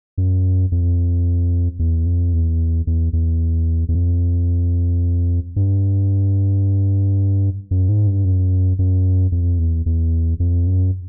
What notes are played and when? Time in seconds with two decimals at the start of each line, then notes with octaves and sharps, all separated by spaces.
0.18 F#2
0.72 F2
1.79 E2
2.06 F2
2.33 E2
2.87 E2
3.13 E2
3.88 E2
3.95 F2
5.56 G2
7.71 F#2
7.89 G#2
8.07 G2
8.25 F#2
8.79 F#2
9.32 F2
9.59 E2
9.86 E2
10.40 F2
10.67 F#2